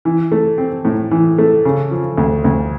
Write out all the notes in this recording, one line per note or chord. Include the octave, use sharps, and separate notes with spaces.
E3
A3
C4
A2
E3
A3
C#3
F3
D2
D2